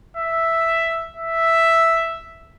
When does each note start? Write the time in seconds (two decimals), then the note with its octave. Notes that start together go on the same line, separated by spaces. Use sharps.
0.17 E5
1.17 E5